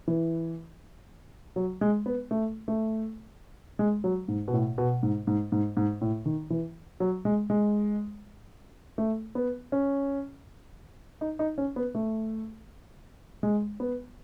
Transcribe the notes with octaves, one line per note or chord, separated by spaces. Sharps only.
E3
F#3
G#3
B3
A3
A3
G#3
F#3
G#2
B2
A2
B2
G#2
G#2
G#2
G#2
A2
D#3
E3
F#3
G#3
G#3
A3
B3
C#4
D#4
D#4
C#4
B3
A3
G#3
B3